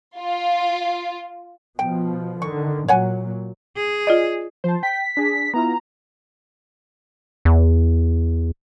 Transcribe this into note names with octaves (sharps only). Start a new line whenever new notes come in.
F4
B2 F3 G5
D3 D#3 C#6
A#2 F#3 C#5 F#5 G#5
G#4
F4 D5 D#5
F3 C5 A5
G5 B6
D4 G#4
B3 E4 F4 A#5
E2